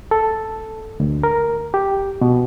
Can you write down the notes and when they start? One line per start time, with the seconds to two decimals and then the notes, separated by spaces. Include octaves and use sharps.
0.11 A4
1.00 D2
1.23 A#4
1.74 G4
2.21 B2